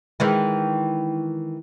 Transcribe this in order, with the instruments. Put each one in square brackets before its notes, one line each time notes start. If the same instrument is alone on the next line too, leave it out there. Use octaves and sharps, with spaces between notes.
[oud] D#3 E3 G#3